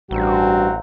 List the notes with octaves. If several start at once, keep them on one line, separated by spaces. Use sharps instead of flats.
A1 G2 C4 F#4 F#5 A#5